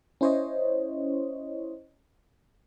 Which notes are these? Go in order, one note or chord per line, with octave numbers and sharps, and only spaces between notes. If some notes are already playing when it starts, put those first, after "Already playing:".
C#4 E4 C5 C#5 D#5